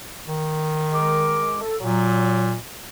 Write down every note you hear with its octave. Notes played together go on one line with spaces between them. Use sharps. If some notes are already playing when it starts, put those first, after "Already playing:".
D#3
G#3 A#4 D6
A4
A#2 F#3